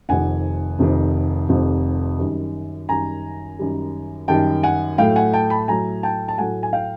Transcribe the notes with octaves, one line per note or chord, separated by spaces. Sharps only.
F1 F2 C3 D#3 F#5 G#5
F1 F2 C3 D#3
F1 F2 C3 D#3
F#2 D#3 G3
F#2 D#3 G3 G#5 A#5
F#2 D#3 G3
F#2 D#3 G3 G5 A5
F#5 G#5
A2 F#3 A3 F5 G5
F#5 G#5
G5 A5
A5 B5
A2 F#3 A3 G#5 A#5
G5 A5
A5
A2 F#3 A3 F#5 G#5
G#5
F5 G5